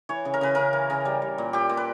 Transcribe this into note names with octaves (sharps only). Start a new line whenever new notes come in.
E3 C#5
C#3
A#4
C#3 B4
C#3 A#4
E3
C#3
G3
G3
A#2
A#2 G4
A#2
B4